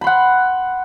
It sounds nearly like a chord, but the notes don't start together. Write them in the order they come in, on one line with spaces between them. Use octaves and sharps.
B5 C6 F#5